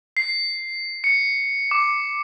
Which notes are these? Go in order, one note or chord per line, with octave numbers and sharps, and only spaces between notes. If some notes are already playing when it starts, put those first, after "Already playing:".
C7
C#7
D6